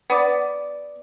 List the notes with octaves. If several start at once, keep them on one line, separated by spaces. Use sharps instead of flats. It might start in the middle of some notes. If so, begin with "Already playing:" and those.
B3 D5